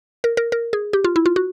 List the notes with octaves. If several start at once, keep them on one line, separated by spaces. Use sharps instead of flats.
A#4
A#4
A#4
G#4
G4
F4
E4
F4
F#4